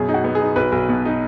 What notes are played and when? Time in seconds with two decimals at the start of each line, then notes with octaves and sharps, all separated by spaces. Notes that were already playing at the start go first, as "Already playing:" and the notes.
Already playing: F#2 B2 G#4
0.09 D#4
0.14 F#4
0.24 B3
0.35 G#4
0.41 D#4
0.56 B1 B4
0.72 B1
0.89 B2
1.05 D#4